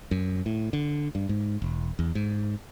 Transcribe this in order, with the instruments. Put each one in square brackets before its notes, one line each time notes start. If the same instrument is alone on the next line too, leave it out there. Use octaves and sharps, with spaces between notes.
[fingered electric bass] F#2
A2
D3
G2
G#2
E1
E2
G#2